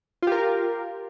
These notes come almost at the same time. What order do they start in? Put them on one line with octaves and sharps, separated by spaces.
F4 G4 A#4